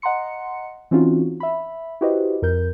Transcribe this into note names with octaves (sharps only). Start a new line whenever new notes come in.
D#5 F#5 A#5 C6 C#7
E3 C4 C#4 D#4 F4 F#4
E5 B5
E4 F#4 G4 B4 C5 D#5
F2 A#4 G6